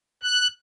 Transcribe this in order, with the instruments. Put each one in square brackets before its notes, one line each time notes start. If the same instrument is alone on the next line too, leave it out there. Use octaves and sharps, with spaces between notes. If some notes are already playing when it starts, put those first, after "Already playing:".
[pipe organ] F#6